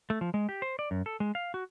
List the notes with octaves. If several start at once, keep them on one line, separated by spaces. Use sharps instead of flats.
A3
F3
G#3
G4
C5
D5
F#2
A4
G#3
F5
F#4